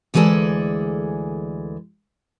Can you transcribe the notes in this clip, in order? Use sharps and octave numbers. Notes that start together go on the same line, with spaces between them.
D2 E3 G#3 G#4 A4 D5